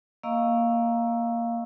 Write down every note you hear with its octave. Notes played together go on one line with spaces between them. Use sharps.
A#3 D#5 F5 A#5 C#6 E6